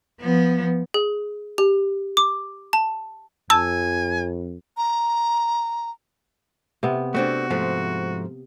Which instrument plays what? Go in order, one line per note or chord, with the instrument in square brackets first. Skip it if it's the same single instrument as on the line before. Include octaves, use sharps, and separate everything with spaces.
[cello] F3 B3
[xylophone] G#4
G4
D6
A5
[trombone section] F2 [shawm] G#5 [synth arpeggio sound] A5 [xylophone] E6
[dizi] A#5
[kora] C3 B3
[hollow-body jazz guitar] A3 C4 D4 [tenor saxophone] F#4
[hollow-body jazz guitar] G#2 F3 A3